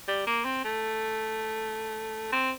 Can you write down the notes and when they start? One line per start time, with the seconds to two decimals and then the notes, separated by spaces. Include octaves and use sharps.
0.08 G3
0.27 A#3
0.45 C4
0.64 A3
2.32 C4